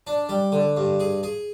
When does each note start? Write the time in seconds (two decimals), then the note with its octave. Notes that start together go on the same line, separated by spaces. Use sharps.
0.07 D4
0.29 G3
0.52 D3
0.77 G2
1.00 G#4
1.23 G#4